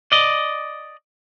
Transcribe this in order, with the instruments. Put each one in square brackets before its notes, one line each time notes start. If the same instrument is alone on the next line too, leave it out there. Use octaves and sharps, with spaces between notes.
[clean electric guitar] D5 D#5